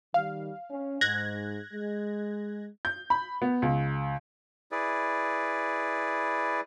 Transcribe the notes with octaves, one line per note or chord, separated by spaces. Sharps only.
D#3 G3 F5
C#4
G#2 F#6 G#6 A#6
G#3
G6
B5
B3
C#2
E4 G#4 B4 D5